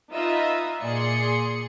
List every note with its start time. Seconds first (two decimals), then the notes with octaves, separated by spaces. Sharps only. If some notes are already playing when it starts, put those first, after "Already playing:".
0.14 D#4 F4 B4 D#5 E5
0.82 A#2 G#4 D5 C6 C#7